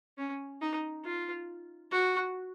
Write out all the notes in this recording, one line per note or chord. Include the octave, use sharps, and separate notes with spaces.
C#4
D#4
F4
F#4